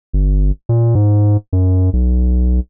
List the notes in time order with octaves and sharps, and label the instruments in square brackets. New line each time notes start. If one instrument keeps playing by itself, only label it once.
[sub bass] G1
A#2
G#2
F#2
B1